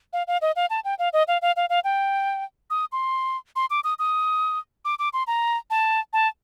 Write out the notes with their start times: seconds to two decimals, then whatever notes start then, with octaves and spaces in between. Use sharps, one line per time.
0.13 F5
0.27 F5
0.42 D#5
0.56 F5
0.70 A5
0.85 G5
0.99 F5
1.13 D#5
1.28 F5
1.42 F5
1.56 F5
1.70 F5
1.84 G5
2.70 D#6
2.92 C6
3.56 C6
3.70 D6
3.84 D#6
3.99 D#6
4.85 D6
4.99 D6
5.13 C6
5.27 A#5
5.70 A5
6.13 A5